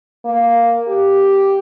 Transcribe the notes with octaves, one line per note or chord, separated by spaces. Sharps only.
A#3
G4